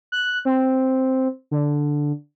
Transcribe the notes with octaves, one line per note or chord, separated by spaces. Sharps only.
F#6
C4
D3